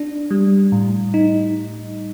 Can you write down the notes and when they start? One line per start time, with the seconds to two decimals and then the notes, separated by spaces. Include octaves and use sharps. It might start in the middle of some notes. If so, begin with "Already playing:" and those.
Already playing: D4
0.31 G3
0.72 A2
1.14 D#4